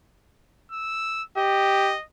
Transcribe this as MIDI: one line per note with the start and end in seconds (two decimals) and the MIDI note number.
0.72 1.23 88
1.38 1.95 67
1.38 2.04 75